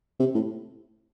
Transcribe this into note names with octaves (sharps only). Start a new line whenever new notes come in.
C3
A2